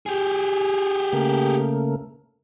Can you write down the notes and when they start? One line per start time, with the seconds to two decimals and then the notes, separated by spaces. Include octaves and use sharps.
0.06 G4 G#4
1.13 C#3 A3 A#3